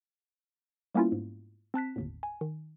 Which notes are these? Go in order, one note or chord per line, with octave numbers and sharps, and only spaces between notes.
G3 A#3 B3 C#4 E4 F4
G#2
C4 A5 F#6 B6
G1 D#2 A2
G#5
D#3